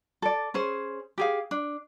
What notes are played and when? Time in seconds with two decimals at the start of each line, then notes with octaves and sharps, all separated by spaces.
0.22 A4 D5
0.54 C#4 G#4 C5
1.18 G4 G#4 F5
1.51 D4